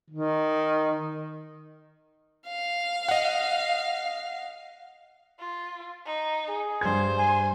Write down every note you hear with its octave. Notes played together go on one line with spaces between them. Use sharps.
D#3
F5
D#5 F#5
F4
D#4
G#4
G2 C5 G#6
G#5